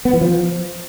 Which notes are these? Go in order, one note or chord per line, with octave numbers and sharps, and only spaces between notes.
B3
E3
F3